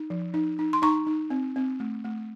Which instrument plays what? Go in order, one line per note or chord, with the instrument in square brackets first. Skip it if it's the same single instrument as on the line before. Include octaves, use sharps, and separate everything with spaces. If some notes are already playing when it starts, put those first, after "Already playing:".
Already playing: [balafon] D#4
F3
D#4
D#4
C6
D#4 A#5 C#6
D#4
C4
C4
A3
A3